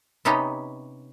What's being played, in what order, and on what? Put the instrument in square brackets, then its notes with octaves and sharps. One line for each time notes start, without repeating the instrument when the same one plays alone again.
[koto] C3 B3 C#4 D#4 G4 D#5